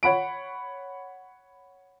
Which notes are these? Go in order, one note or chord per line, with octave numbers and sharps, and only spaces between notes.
C#5 F#5 B5 D7